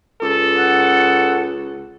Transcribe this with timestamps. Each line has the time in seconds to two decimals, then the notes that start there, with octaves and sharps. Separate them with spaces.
0.22 C#2 A4
0.58 F#5